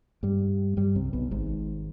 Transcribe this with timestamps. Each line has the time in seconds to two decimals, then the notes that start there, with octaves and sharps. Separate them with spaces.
0.23 G2 G3
0.77 G2 G3
0.95 C2 C3
1.13 B1 B2
1.31 G#1 G#2